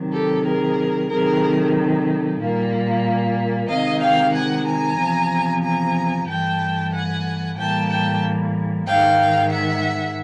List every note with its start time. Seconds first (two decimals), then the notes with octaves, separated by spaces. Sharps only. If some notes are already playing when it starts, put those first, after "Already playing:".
Already playing: C3 D#3 F#3
0.13 G4 A4
0.45 G#4 A#4
1.10 C3 D#3 F#3 A3 G#4 A#4
2.40 A#2 G3 A#3
3.68 C3 D#3 G#3 D#5 F5
4.01 F5 G5
4.33 F#5 G#5
4.66 G#5 A#5
4.98 E2 C3 F3
5.63 G#5 A#5
6.27 G2 E3 A3 G5 A5
6.92 F#5 G#5
7.57 A2 E3 G3 A#3 G5 A5
7.89 G5 A5
8.86 G#2 D#3 G#3 F5 G5
9.51 E5 F#5